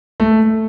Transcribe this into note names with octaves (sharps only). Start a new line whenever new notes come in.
A3